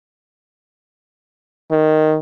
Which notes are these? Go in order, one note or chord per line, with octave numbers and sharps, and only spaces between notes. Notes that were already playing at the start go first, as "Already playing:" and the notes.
D#3